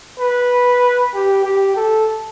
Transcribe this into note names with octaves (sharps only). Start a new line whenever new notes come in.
B4
G4
G4
A4